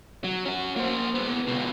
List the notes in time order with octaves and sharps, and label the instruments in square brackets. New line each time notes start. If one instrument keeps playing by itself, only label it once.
[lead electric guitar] F#3
C#4 F#4
A#3 C5
G#3 B3
C#2 B2